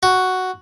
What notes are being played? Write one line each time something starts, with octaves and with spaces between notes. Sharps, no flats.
F#4